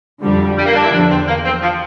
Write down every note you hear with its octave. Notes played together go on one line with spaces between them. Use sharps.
F2 D3 G3
G3
A#3
D4
E4
E2 D3 F3 D4
C4
A#3
C4
F3